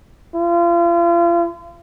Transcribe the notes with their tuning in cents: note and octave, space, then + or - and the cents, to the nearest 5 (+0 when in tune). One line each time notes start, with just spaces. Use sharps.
F4 -35